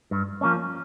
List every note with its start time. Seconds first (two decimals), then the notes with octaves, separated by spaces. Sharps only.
0.11 G2
0.41 F3 A#3 C#4